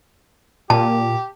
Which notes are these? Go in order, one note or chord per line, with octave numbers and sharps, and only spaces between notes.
A#2 G4 A5